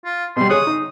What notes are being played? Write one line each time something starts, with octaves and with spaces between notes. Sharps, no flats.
F4
B2 G3 C6
G#4 C#5 D#6 F#6
D#4